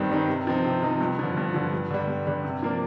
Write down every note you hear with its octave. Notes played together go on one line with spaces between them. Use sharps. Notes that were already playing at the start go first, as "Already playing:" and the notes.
Already playing: G2 D#3 G3 C4 D#4
D#3 G3 C4 D#4
C3
F3 C4 D#4
C3
F3 C4 D#4
G2
D3 F3
G2
D3 F3
G2
D3 G3
G2
D3 G3
C3
F3 A#3 D4